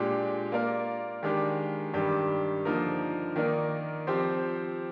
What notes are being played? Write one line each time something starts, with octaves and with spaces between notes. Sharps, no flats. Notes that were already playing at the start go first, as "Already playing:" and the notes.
Already playing: A#2 G#3 D4 G4
A#3 F4 A#4 D5
D#3 G#3 D4 G4
G2 D#3 G3 D4 G4
D3 F3 A#3 D#4 A#4
D#3 A#3 D#4 A#4 D5
F3 C4 G4